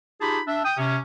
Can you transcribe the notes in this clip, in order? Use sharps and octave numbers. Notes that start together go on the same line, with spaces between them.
D#4 F4 G4 G#4 A5 B5
D4 E5
G5 D#6
C3 C#4